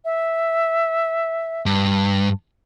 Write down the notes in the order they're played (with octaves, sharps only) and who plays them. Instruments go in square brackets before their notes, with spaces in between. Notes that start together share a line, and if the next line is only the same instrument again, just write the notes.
[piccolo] E5
[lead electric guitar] G2